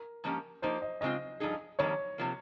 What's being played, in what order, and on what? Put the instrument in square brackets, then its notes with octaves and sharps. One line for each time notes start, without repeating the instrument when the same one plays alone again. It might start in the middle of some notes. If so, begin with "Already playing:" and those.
Already playing: [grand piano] A#4
[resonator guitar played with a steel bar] G#2 F3 A#3 C#4 G4
[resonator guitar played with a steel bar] F3 A#3 D#4 G4 [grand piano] C5
[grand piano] D#5
[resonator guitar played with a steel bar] C#3 G#3 C4 F4 [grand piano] D#5
[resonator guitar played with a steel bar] G2 F3 D#4 G#4
[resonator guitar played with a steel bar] F2 D#3 G3 A#3 [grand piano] C#5
[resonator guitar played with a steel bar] C3 F3 A#3